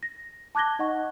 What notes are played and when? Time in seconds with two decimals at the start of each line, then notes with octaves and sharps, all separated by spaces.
0.03 A#6
0.55 A5 D6 F#6 G#6 A#6 G7
0.79 D#4 D#5 F#5 C#6